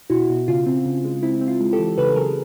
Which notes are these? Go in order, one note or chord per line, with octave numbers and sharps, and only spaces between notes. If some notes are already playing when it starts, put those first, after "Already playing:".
B2 E4 F#4
B2
C#3 F4
C4
C#3
G#3
C4 E4
C4
F4
G#3
G4 A4
E3
C#3 A4 B4
F#3 G#4 A#4